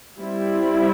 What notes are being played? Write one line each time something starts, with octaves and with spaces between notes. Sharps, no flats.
G3 C4 E4